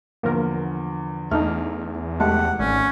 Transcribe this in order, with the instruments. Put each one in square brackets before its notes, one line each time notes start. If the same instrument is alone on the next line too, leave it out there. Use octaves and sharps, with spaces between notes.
[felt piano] E2 D3 F3 [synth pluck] A#3 A#4
[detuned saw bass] E2 [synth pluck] A3 D4 D#4 [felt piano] F6
[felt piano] F1 G4 A5 [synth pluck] G#3 A3 [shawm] F#5
[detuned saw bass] G#1 [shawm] C#4 [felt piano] D5